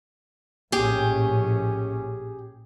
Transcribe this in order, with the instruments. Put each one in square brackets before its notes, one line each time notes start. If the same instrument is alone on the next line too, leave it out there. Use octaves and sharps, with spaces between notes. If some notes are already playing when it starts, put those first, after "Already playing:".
[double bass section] A#1 A2 C#4 [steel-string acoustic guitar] G4 G#4